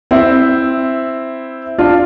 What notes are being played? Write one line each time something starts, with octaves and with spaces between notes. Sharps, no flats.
C4 E4
D4 F4